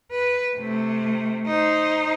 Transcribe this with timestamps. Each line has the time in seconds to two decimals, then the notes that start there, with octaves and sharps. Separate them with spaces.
0.11 B4
0.57 C3 A3
1.47 D#4 C5